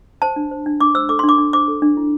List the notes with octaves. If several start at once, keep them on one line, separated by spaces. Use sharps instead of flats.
C5 A5
D4
C5
D4
D4 D6
C5 E6
A4 D6
C6
D4
D6
D4
C5 D6
A4
D4
E4